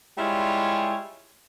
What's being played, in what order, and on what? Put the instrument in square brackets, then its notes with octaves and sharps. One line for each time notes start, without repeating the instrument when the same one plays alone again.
[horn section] G3 G#3 E4 F4 C#5